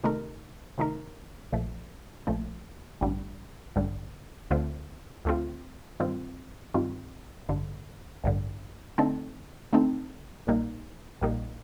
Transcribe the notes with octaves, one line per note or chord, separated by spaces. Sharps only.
C3 D#3 A3 D#4 A#4
C3 D#3 A3 D#4 A#4
A#1 A#2 F3 A3
A#1 A#2 F3 A3
A1 G2 D3 G3
A1 G2 D3 G3
D2 D3 A3 C4 F4
D2 D3 A3 C4 F4
G2 D#3 G3 C4 F4
G2 D#3 G3 C4 F4
A1 G2 D3
A1 G2 D3
D3 A3 C4 D#4 A4
D3 A3 C4 D#4 A4
A#1 A#2 G3 A#3 D#4
A#1 A#2 G3 A#3 D#4